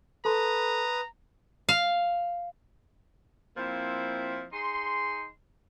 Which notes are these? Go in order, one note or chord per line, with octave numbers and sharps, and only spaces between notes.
A4 B4 A5 A#5 C6 D#6
F5
F3 A#3 C4 E4
D#4 G#4 C6